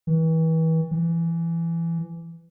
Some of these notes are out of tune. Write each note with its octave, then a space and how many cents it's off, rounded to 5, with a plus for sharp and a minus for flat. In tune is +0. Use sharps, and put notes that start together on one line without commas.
E3 -35
E3 +20